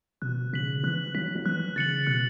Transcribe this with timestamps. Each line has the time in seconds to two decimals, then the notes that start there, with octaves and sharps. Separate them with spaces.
0.22 B2 F#6
0.53 C#3 B6 F#7
0.84 E3 F#6
1.15 F#3 B6 F#7
1.36 F#3
1.46 E3 F#6
1.76 C#3 A6 C#7 F#7
2.07 B2 F#6